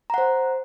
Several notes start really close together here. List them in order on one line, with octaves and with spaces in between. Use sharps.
A#5 F#5 C5